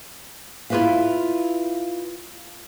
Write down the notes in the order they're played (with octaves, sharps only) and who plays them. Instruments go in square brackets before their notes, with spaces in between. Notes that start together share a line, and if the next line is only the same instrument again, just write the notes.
[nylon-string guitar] E4 F4 G4 B4 E5 F5